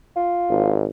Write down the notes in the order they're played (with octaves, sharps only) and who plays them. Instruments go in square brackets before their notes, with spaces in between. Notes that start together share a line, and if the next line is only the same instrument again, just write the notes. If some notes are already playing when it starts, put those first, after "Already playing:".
[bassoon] F4
[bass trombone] G#1